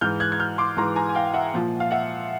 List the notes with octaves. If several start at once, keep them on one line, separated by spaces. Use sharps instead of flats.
G#2 E3 F6 G6
F#6 G#6
G#6
F6 G6
C6 D6
G#2 E3 A#5 C6
G#5 A#5
G#5
F5 G5
E5 F#5
A#2 F3
F5
E5 F#5